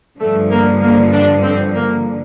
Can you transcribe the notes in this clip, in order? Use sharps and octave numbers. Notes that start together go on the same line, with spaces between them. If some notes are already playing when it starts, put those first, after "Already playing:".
G2 D3 F3 A3
A#3
A#3
D4
C4
A#3